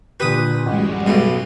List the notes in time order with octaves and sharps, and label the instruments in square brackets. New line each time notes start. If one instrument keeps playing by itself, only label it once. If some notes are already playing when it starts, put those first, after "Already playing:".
[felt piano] A#2 D3 G4 [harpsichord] B4 D#6
[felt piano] A1 [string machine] F#2 G3 G#3
[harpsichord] B1 B2